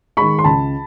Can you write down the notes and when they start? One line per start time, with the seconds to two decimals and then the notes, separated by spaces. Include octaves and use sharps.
0.17 D#3 G#3 B5 C#6
0.39 C6
0.44 C#2 A5 B5